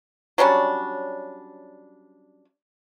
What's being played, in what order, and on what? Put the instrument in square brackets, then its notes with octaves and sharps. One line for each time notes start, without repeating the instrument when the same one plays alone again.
[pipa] F#3 G3 C#4 D4